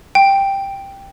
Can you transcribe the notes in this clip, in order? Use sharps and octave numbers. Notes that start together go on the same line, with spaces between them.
G5